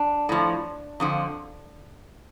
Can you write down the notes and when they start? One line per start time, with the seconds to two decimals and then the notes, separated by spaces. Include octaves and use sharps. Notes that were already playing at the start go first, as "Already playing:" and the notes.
Already playing: D4
0.29 A2 F3
1.00 F2 D3 F3